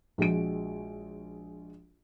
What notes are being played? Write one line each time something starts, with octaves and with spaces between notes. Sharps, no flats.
A#1 G#3 F#4 D7